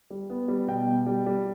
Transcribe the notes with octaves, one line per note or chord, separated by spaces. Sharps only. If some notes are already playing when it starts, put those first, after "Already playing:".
G3
B3
G3
B2 G5
B2
G3
G3